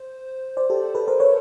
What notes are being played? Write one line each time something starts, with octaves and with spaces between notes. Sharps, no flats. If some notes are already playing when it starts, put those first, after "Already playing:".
Already playing: C5
C5 D5
G4 A4
A4 B4
A#4 C5
B4 C#5